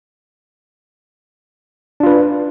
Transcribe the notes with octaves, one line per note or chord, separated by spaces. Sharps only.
D4 F4 B4